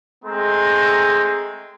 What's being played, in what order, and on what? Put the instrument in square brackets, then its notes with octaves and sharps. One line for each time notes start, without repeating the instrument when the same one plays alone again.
[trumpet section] G#3 A3 C4 A#5